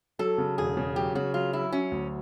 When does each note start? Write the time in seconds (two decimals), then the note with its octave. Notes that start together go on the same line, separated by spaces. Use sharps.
0.19 F#3 A4
0.38 C#3
0.58 E1 G#4
0.77 C#3
0.96 F#3 G4
1.15 C#3 F#4
1.34 F#3 F4
1.53 F#3 E4
1.72 F#3 C#4
1.92 D2